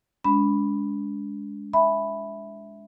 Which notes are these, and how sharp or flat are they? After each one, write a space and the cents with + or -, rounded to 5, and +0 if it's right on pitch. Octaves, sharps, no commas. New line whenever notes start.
G#3 +0 D4 -40 B5 +0
E5 +0 G#5 +0 B5 +0